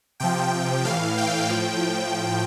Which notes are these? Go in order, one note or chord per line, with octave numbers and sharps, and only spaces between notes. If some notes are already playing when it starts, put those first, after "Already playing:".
C3 F3 G5
A2 E3 F5
G5
A2 F3